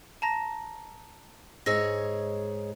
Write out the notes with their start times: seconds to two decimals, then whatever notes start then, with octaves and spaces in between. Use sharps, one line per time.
0.22 A5 A#5 A#6
1.66 G#2 G#4 C#5 D#5 E6 A#6